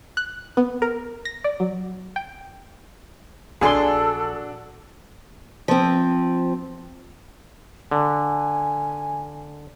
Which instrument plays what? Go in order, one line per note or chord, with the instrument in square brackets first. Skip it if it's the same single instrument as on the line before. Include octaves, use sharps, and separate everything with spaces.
[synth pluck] F#6
B3
A#4
A#6
D5
F#3
G5
[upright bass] A#1 [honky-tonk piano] D4 F#4 [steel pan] G#4 C6 [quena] A4
[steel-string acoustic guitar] F3 C4
[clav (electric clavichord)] D3 [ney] G#5